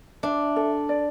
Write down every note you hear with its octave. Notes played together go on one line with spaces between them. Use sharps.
D4 E5
A4
D5